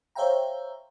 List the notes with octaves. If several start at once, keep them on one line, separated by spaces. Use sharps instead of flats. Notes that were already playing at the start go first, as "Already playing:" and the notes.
C5 C#5 E5 F5 G5 A#5